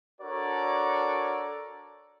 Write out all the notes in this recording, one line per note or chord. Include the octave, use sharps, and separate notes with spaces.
D4 F#4 A4 A#4 C#5 D5